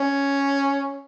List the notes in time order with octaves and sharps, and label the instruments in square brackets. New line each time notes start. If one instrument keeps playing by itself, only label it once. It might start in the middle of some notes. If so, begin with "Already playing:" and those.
Already playing: [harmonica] C#4